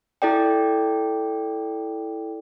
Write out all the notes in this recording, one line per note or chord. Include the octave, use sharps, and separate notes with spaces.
E4 A4 D5 G5